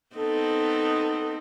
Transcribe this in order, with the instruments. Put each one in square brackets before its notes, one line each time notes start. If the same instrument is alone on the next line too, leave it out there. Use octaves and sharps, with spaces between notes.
[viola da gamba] B3 C4 D#4 [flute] A4